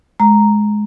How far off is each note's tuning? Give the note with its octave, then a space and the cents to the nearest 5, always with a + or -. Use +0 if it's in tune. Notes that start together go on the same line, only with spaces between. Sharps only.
G#3 +15 A#5 -5